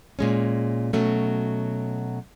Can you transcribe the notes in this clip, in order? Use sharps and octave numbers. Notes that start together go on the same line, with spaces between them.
A#2 G#3 C#4
B2 F#3 A3 C#4